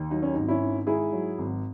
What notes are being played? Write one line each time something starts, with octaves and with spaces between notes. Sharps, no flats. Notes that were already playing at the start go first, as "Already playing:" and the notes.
Already playing: D#2
F#3 D#4
C#4
G#1 D#4
C#4 E4
D#3
G#2 E4 G#4
F#3
G#1